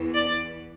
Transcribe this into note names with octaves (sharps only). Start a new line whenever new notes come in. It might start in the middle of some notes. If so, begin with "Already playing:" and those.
Already playing: E2 E3 B3
D5